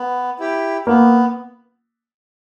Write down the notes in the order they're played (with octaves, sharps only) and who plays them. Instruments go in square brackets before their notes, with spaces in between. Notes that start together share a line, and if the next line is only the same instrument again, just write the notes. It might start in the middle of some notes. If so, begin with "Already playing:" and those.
Already playing: [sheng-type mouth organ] B3
E4 G4
[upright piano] A#3 [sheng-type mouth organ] B3